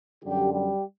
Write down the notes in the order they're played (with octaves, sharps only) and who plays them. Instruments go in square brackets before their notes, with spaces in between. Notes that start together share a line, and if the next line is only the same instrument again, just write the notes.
[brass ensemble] F#2 D3 G3 G4
G3 G4